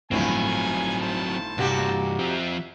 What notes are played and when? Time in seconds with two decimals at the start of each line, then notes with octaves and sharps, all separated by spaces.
0.11 G1 A2 D#3 F3 F#3 C4 E4 G#5
1.01 C5 A5
1.58 C2 G2 A#2 F#4 G4
2.18 F3 C4 E5